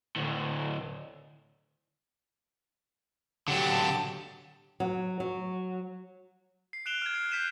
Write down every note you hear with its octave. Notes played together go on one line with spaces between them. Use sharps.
D2 A2
D3 F#3 G4 A5
F#3
F#3
C7
F#6 C7 D7 E7 F7 G7
F6 G#6
C7
F#6 G6 B6 C7 D#7 E7